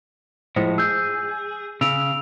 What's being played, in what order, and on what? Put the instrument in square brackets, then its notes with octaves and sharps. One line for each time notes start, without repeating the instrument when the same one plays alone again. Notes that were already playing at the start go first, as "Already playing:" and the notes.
[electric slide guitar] A2 F3 G#3 [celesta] C5
[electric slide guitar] G#4 [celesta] E6 G6
[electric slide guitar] C#3 [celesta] E6 D7 F7